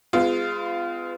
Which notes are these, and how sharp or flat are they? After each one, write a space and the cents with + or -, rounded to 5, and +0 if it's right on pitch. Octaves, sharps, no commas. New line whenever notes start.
G#3 -10 B3 +40 F4 -15